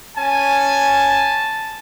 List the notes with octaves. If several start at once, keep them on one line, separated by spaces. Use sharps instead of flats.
C#4 G#5 A5